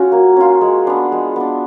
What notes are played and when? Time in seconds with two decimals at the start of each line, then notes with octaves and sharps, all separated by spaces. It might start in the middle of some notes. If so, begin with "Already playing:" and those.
Already playing: C#4 F4 F#4
0.12 A#3
0.37 C#4 F4
0.61 G#3
0.87 B3 D4
1.12 G#3
1.36 B3 D4